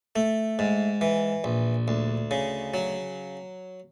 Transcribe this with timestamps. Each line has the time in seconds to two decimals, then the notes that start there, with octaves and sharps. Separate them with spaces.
0.16 A3
0.59 G#2
1.01 E3
1.44 A#1
1.88 D2
2.31 C#3
2.74 F#3